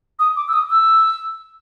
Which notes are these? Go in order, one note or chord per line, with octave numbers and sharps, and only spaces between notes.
D#6
D6
E6
D#6
E6